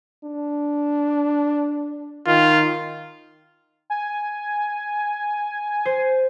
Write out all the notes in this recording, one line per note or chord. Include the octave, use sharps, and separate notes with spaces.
D4
D#3 F4
G#5
C5